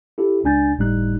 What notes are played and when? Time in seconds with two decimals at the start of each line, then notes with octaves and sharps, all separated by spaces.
0.18 E4 G4 A4
0.44 C#2 D4 G#5 G6 A6
0.78 G1 A2 G3 D#4 F#6